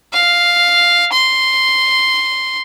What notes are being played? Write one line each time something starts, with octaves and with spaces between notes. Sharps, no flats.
F5
C6